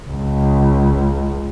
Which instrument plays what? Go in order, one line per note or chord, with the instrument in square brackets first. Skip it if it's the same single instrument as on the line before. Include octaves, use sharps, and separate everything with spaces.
[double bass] C#2